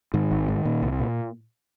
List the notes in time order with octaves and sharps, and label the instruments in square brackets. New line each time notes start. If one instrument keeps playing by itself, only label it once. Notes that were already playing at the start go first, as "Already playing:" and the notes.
[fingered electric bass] G#2 D#3
G#1
G#2
A#2
C2
A#2